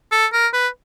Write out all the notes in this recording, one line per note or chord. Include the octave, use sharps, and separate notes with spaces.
A4
A#4
B4